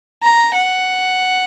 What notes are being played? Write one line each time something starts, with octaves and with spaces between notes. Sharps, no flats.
A#5
F#5